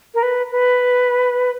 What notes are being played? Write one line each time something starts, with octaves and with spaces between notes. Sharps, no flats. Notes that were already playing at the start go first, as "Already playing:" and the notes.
A#4
B4
B4